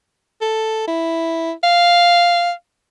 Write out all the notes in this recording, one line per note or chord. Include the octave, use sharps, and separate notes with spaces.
A4
E4
F5